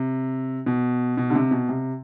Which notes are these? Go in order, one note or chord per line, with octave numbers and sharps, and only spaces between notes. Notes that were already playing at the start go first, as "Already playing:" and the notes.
Already playing: C3
B2
B2
D3
C3
B2
C3